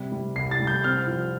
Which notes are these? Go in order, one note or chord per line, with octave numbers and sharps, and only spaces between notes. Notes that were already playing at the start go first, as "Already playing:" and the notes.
Already playing: C3 G3
G3
C2 C7
A6
G3
G6
C4 F6
F3